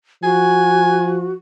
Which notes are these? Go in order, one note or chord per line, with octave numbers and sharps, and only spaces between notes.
F3 F#4 G#5